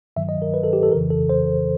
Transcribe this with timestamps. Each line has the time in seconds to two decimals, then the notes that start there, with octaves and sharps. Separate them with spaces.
0.16 G2 D#3 F#3 E5
0.29 D#5
0.42 A#4
0.54 B4
0.64 A4
0.73 G4
0.83 A4
0.92 F2 C#3 E3 A#4
1.10 A4
1.29 C5